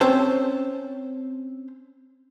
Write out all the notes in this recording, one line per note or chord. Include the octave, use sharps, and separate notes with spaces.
C4 C#4 C5 A5